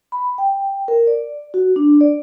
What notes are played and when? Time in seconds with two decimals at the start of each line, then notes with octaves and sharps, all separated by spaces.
0.12 B5
0.38 G5
0.88 A#4
1.07 D5
1.54 F#4
1.76 D4
2.01 D5